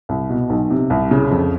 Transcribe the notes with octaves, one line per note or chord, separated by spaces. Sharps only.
C2
B2
B1
C3
C2
C#3
F2